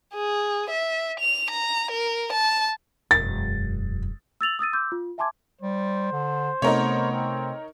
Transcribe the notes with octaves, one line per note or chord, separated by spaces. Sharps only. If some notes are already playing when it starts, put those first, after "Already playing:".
G#4
E5
F7
A#5
A#4
A5
E1 F#2 A6
E6 A6 F7 F#7
D#6 E6 A6 D#7
C6 D6 E6 G6
F4
E5 G#5 A5 C6 D6 G#6
G3 C5
D3
C3 A3 B3 D#4 A#4 C#5
C4